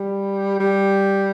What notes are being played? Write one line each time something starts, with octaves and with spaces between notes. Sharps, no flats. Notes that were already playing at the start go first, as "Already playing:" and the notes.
Already playing: G3
G3